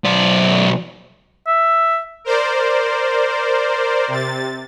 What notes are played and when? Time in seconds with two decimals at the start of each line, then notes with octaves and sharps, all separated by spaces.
0.04 B1 D5
1.47 E5
2.24 A#4 C5 D5
4.08 C3 A6